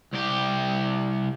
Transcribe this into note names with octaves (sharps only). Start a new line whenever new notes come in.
C2 G4